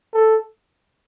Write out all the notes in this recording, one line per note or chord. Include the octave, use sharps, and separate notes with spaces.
A4